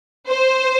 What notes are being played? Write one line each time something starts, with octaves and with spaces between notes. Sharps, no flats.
C5